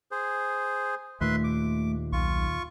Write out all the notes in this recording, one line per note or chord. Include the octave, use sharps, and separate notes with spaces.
G#4 C5
D#2 A#2 A3 B4 E5 C6
D6
B1 F4 C#6